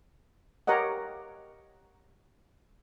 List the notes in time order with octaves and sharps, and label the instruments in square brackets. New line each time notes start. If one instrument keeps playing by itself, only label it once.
[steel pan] G4 A#4 C#5 D#5 F#5